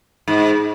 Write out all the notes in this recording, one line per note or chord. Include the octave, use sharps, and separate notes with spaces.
G#2